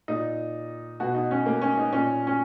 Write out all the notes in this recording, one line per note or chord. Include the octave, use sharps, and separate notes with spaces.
A#2 D#4
B2 F#4
D#4
C#4
A#3
C#4
D#4
A#2 C#4
C#4